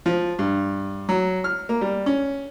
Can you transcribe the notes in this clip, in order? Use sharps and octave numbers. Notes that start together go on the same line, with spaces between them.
F3
G2
F#3
F6
A#3
G3
C#4